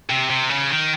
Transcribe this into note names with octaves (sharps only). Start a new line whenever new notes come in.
C3
C3
C#3
D#3